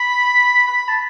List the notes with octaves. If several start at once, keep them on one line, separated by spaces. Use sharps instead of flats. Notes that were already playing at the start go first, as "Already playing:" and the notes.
Already playing: B5
B5
A5